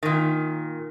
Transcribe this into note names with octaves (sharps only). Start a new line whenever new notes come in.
A#2 D#3